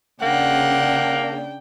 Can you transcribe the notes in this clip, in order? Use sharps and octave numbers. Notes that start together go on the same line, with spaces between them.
C#3 A#3 D4 F#5 G5